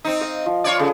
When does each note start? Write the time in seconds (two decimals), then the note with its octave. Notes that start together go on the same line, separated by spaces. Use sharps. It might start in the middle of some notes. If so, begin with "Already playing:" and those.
0.05 C4 D#4
0.21 D#5 F5
0.46 F3
0.64 F4 C#5 D5
0.79 C#3 G#4 A4